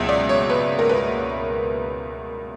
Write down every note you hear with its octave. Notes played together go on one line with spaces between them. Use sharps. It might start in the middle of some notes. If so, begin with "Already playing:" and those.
Already playing: C#2 B2 F#3 E5
D5
C#5
B4
A#4
B4